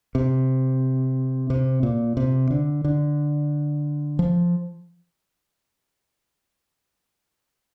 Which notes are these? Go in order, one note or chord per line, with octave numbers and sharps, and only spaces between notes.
C3
C3
A#2
C3
D3
D3
F3